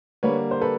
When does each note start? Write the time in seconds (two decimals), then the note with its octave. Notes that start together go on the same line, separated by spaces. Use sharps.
0.23 D3 G3 A#3 B4 C#5
0.51 C5
0.61 A4 B4